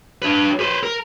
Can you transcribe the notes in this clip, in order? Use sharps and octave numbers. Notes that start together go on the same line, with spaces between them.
D4 B4
B4 C5
A#4